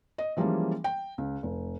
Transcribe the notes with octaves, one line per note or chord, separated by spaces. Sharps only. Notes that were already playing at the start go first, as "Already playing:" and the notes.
D#5
E3 F3 G3 G#3 A#3 C#4
G5
C#2
F1